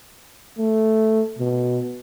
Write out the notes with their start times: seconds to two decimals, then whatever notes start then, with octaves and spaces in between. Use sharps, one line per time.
0.59 A3
1.39 B2